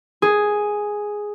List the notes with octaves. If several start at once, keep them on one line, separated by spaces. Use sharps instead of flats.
G#4